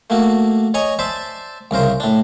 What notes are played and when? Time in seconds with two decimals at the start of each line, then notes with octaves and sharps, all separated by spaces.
0.10 A3 A#3 F#4
0.74 C#5 D#5 G#5 A#5 C#6
0.99 C5 D5 E5 A5
1.71 C2 C#3 A#4 C5
2.00 A2 D4